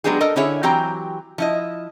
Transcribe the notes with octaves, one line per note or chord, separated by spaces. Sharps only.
F#3 G#3 B3 D4 G4 G#4
A4 A#4 D#5
D3 C#4 E4 G#4 C#5 E5
E3 F#3 C4 G4 G5 A#5
F3 E4 D#5